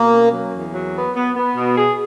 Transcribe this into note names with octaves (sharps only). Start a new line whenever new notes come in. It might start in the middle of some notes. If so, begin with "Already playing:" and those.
Already playing: B2 A#3
C#4
F#3
E2
F#3
B3
B3
B3
B2
G#4